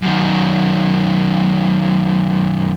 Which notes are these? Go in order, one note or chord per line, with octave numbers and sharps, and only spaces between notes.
F#2 D#3